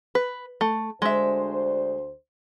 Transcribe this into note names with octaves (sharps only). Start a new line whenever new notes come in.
B4
A3
D2 G#3 D4 C5 E5